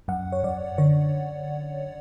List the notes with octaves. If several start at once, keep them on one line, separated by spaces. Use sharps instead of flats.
F#2 F#5
C#5
F#2 D5
D3 C#5